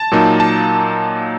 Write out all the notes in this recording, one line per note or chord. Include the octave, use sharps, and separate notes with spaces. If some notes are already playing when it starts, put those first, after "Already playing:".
Already playing: A5
A#2 F#3 A#3 D#4
A5